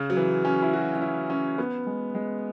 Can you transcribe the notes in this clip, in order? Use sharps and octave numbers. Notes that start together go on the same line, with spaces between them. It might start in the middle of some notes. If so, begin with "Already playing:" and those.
Already playing: C#3
F#3
E3
C#4
E4
F#4
C#4
E4
C#4
B3
G#3
G#3